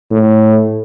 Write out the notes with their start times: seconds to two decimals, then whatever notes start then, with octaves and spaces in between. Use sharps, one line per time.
0.12 A2